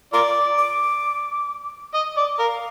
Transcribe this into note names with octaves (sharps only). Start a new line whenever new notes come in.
F4 A#4 D5 D6
D6
D#5
D5
A#4 F5